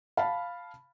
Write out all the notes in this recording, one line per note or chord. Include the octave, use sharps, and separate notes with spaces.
F5 A5 B5